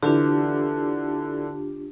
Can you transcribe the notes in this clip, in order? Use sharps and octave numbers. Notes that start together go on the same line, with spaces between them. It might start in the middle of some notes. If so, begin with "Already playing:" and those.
D3 E3 D4 F4 G4